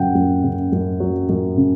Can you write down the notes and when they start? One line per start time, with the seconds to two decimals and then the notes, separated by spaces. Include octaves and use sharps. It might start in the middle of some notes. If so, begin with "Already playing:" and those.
Already playing: F#2 C#3 F#3 F#5 G5
0.15 F#2
0.44 C#3
0.72 F#2
1.00 F#3
1.29 F#2
1.57 C#3